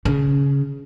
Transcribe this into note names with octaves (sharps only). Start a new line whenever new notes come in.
C#3